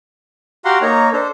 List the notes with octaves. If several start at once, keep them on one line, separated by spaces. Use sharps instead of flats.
F#4 G4 F5 F#5 A#5 C6
A#3 D#4 C#5 A#5
D4 A4 C5